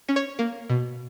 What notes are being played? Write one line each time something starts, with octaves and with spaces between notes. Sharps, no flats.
C#4
C#5
A#3
B2